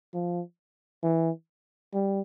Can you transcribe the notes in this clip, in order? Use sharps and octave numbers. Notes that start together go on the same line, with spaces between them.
F3
E3
G3